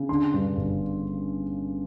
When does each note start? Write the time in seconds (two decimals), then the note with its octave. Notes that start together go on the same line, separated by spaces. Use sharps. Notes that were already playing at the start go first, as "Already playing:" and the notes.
Already playing: C#3
0.09 D3 C6
0.34 G2
0.57 G1